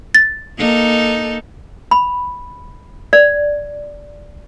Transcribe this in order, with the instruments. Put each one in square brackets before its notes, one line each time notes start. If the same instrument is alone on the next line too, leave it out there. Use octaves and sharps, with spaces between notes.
[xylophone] A6
[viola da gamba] A#3 D#4 A4
[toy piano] B5
D5